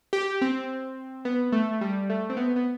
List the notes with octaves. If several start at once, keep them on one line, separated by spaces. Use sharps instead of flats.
G4
C4
B3
A3
G3
A3
C4
B3
B3